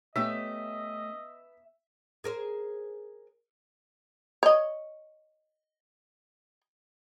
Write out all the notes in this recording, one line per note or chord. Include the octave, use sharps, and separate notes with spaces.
A3 B3 C#4 G4 D#5 E5
G#4 A#4 C5
C#5 D#5